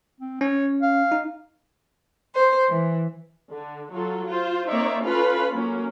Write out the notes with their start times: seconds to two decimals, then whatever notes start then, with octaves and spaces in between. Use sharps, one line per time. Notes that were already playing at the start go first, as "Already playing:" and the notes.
0.20 C4
0.41 C#4 C#5
0.82 F5
1.12 D#4
2.35 C5
2.69 E3
3.51 D3
3.93 F#3 F4 A4
4.26 F4 C5
4.66 A#3 C4 D#4 C#5 D5 E5
5.02 C#4 F4 A4 B4 F5 B5
5.52 F#3 A#3 C#4